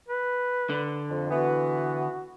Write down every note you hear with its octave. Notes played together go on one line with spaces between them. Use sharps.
B4
D3
F2
E3 B3 F#4